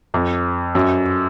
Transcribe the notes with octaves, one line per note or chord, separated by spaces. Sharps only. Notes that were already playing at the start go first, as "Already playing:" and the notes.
F2
F#2